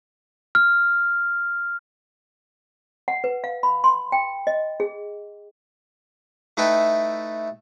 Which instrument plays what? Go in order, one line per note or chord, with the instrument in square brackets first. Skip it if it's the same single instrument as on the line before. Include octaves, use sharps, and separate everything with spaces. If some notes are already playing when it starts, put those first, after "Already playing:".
[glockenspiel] F6
[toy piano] F#5
B4
F5
B5
C6
G5
D#5
G#4
[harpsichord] A3 D#4 E4 A4 B4 G5